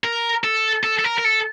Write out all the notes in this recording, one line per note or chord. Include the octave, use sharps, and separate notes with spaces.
A#4
A4
A4
A4
A#4
A#4
A4